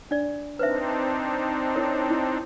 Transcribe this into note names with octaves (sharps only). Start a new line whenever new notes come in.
D4 D5
C4 D4 D#4 B4 C5 E5
E4 A#4 C#5
E4